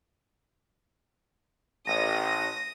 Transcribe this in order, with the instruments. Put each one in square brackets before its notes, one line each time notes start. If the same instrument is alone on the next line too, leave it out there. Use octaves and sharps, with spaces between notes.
[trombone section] A1 [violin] D#6 [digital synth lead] A#6